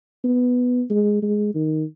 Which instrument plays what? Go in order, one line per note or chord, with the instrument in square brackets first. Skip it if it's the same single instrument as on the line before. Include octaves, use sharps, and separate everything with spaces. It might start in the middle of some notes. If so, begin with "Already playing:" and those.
[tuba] B3
G#3
G#3
D#3